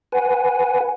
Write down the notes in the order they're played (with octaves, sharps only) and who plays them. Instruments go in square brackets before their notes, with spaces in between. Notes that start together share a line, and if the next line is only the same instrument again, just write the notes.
[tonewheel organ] B4 F#5 G#5